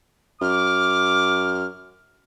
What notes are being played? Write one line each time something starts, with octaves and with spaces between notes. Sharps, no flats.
F#2 D6 F6